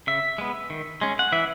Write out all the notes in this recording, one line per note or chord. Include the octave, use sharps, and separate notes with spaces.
C#3 E5
G#3 B3
D#3
G#3 C#4
F#5
E3 E5